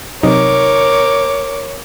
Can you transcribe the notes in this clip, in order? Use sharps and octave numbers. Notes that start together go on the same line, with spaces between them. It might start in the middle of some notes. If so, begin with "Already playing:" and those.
C3 F#3 D#4 A#4 C#5 D6